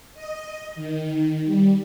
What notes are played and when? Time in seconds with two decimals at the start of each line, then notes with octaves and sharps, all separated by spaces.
0.14 D#5
0.76 D#3
1.46 G3